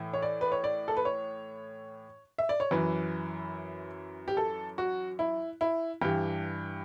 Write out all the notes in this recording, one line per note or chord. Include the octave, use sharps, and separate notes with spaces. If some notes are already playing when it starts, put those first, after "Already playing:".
Already playing: A2 E3
C#5
D5
B4
C#5
D5
A4
B4
C#5
E5
D5
C#5
F#2 E3 B4
G4
A4
F#4
E4
E4
G2 E3 G4